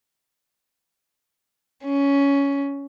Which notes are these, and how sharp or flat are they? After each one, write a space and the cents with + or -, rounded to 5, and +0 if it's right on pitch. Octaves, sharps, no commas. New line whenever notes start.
C#4 +15